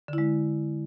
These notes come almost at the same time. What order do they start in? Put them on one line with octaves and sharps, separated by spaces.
D3 E4 G#3